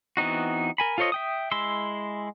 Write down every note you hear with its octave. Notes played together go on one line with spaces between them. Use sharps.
E3 B3 C4 D#4 F#4
A#4 G#5 B5
F4 A4 C5 C#5 D#5
E5 G5 D#6
G#3 E4 B5 C6 E6